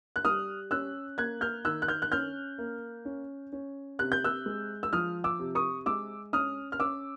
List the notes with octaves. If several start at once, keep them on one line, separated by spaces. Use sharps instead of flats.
F#6
G3 D#6 F6
C#4 E6 F#6
A#3 F#6 G#6
F6 G6
D#3 E6 F#6
F#6
F6 G6
F#6
C#4 F6 G6
A#3
C#4
C#4
C3 F#6
G6
E6 F#6
G#3
E6
F3 D#6 F6
D6 E6
C3
C#6 D#6
G#3 D6 E6
C#4 D#6 F6
F6
C#4 D6 E6